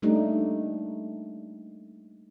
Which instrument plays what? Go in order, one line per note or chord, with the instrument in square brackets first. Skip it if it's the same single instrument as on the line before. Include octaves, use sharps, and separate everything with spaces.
[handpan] G3 A3 A#3 D4 D#4 G4